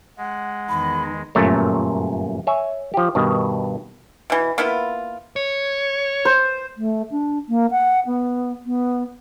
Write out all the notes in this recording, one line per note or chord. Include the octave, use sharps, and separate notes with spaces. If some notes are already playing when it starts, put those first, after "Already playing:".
G#3 F#5
E2 D#3 B5
G1 F#2 A#2 A3 C#5
C#5 E5 G#5
F3 G4
G2 B2 D#3
B2 E3
A#3 B3 E4 F4
C#5
C5
A3
D4
A#3
F#5
B3
B3